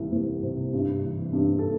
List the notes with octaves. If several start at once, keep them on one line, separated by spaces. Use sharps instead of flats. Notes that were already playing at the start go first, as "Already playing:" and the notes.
Already playing: C2 E3
C2
C3
G2
E3
G2
A4